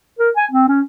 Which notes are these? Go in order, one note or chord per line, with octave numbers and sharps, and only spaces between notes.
A#4
G#5
C4
C#4